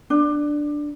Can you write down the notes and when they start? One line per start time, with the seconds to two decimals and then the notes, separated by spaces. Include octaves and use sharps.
0.10 D4